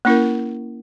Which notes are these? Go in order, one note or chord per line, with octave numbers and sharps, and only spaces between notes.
A#3 C#4 E4 A#4